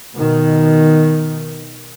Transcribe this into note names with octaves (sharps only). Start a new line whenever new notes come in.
B2 D#3